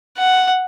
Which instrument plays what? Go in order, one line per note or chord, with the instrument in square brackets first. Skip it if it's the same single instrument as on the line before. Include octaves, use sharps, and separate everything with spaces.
[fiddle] F#5